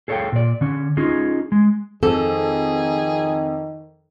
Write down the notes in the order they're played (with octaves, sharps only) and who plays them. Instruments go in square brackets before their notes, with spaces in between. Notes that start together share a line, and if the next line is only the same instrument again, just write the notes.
[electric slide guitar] G#4 A4 C#5 D5 F5 G5
A#2 D5
D3 C#4
C#4 D#4 F4 G#4
G#3
[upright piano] F2 [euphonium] D#3 [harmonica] G#4 [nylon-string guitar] A4